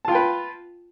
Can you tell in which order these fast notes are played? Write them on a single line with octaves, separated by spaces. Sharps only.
A5 F4 G5 B4